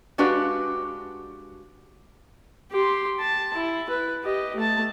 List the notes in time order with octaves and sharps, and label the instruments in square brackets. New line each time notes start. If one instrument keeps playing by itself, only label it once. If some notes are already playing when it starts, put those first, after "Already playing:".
[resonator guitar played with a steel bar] G#3 D4 F#4 G4 B4 F5
[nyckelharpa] G4 C6
A5
E4
B4
G4 D#5
A3 A5